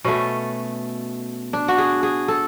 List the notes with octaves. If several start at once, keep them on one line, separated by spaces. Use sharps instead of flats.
B2 A3 C#4
D4
F#4
G#4
G#4
A4